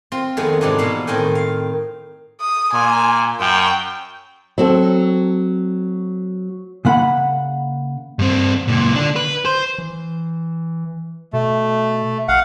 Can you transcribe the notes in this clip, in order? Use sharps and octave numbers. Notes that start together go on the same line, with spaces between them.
C4 F4
F2 D#3 G#3 A3 B3 G#4
G#2 C3 E3 B3 D4 D#4
B2 A#3 B3 E4 F5
A2 D#3 C4 A#4 G5 G#5
F5
D#6
A#2 G#5
F#2 G5
F#3 C4 A4
C#3 A#3 F#5 B5
G2 C4
C#2 A#2
D3 D4
B4
C5
E3
B2 A3
A1 F5 F#5